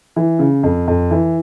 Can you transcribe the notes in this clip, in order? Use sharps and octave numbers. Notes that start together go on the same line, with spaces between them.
E3
C#3
F2
F2
E3